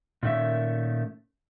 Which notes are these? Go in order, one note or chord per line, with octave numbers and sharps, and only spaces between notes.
A#2 D#3 A3 C#4 E5